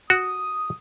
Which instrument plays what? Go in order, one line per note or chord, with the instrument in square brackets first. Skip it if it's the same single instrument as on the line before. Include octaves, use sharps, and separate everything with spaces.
[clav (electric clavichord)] F#4 [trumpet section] D#6